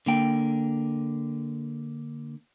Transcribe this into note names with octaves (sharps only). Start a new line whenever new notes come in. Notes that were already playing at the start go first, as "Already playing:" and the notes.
D3 A#3 G5